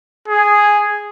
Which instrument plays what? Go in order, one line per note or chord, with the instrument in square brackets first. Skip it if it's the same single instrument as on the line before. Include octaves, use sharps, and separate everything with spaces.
[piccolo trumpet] G#4